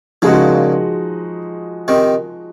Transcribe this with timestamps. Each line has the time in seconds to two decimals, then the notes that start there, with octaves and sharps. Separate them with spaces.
0.22 A#2 C#3 F3 G#3 D#4 F#4
1.88 C3 D#3